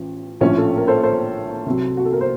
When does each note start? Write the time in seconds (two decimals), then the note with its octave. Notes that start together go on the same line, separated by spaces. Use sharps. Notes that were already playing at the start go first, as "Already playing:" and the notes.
Already playing: A1 F3
0.41 A#1 A2 F3 C#4 F4
0.57 F4 A4
0.77 A#4
0.88 A4 C5
1.03 A4 C5
1.66 C2 C3 F#3
1.97 F#4
2.05 A4
2.13 A#4
2.21 C5